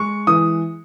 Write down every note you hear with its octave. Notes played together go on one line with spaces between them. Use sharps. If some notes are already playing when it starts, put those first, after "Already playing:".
Already playing: G#3 C#6
E3 D#6